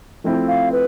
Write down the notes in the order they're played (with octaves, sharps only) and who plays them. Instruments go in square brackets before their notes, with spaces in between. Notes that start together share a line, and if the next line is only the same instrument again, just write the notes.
[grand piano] F3 A3 C4 E4
[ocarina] F5
B4